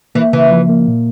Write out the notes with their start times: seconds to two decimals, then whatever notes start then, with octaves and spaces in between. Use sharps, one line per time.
0.15 E3 A#3
0.33 C#3 E3
0.50 F3
0.69 A#3
0.87 A#2